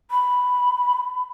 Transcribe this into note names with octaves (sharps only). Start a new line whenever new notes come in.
B5